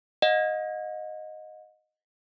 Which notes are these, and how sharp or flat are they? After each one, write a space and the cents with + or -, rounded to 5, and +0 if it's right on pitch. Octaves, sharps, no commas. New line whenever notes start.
D#5 +0 F#5 -40